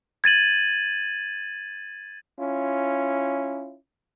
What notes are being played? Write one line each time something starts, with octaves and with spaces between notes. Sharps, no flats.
G#6 A6 D#7 F#7
C#4 E4 F4